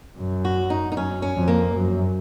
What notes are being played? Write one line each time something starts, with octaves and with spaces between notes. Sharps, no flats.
F#2
F#4
D#4
D#4
F#2 C#4
C#4
F2
A#3
F#2